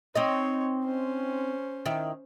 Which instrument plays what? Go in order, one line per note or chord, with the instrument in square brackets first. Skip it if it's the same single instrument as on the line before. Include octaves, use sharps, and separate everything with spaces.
[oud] C4 D#4 D#5 [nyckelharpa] C#5
[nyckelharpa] C#4 C5
[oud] D#3 E4